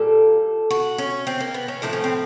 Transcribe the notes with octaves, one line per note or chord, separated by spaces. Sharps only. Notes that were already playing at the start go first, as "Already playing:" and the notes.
Already playing: A#2 G3 A4
F#4
C#4
C4
A#3
B3
C#4
A2 F3 A3 D4
C#4
C4